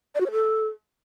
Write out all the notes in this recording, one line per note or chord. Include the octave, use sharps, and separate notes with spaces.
D5
F#4
C#5
A4